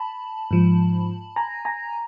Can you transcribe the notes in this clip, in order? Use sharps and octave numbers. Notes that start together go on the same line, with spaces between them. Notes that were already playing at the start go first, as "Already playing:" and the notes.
Already playing: A5 B5
G#2 F3
G#5 A#5
G#5 A#5